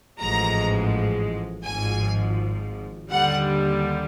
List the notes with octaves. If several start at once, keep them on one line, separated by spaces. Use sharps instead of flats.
A1 G#2 F3 G#3 A#5
G#1 G#2 F3 G#5
D#2 D3 G3 F#5